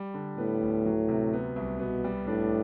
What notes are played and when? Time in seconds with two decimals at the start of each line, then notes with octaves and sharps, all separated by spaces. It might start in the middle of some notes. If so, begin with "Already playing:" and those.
Already playing: G3
0.14 D3
0.38 A2 B3
0.62 D2
0.86 F#3
1.08 C3
1.33 B3
1.56 C2
1.79 B2 B3
2.04 G3
2.27 A2 D4